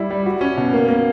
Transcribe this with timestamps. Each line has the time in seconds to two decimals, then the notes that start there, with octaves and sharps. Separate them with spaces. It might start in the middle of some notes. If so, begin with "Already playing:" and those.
Already playing: G3 E4
0.10 G3
0.26 F#4
0.41 C#4
0.57 B2
0.73 A#3
0.88 A#3